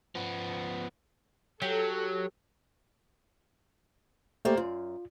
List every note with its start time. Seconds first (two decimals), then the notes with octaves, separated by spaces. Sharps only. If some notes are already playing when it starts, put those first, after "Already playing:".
0.15 F3 B3
1.62 F#3 G4 A4
4.45 A3 A#3 G4 C5 D5
4.57 F#2 F4